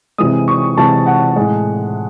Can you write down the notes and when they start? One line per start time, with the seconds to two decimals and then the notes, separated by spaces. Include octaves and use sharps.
0.18 C3 E3 G#3 D#6
0.48 C#6
0.78 C3 E3 G#3 A5
1.06 F#5
1.36 A2 G#3